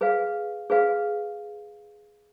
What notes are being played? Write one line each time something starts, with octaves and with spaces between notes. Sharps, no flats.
G#4 B4 F5
G#4 B4 F5